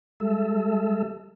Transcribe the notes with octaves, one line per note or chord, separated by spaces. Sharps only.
G3 G#3 A4 E5